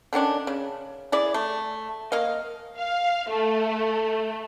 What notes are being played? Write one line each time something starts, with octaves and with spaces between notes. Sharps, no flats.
D3 D#3 C#4 D4
C#3
E4 G#4 D5
A3
A#3 D#5 F5
F5
A3